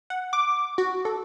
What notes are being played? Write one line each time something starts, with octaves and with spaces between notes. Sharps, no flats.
F#5
D6
F#4
A4